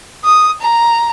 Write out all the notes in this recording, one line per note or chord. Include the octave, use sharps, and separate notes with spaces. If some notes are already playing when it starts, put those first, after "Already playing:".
D#6
A#5